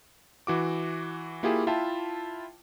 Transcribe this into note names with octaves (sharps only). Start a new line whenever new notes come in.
E3 F#4 D6
A#3 E4 F4 G4 G#4
E4 F4 E5 G5 A5